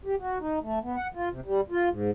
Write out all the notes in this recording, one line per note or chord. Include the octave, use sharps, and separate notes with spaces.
G4
F#4
D#4
A3
B3
F#5
F4
C3
G3
F4
G#2